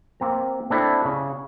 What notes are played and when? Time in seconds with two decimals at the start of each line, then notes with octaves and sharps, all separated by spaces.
0.20 A#3 C4 A#5
0.70 C4 D4 E4 A4
1.05 C#3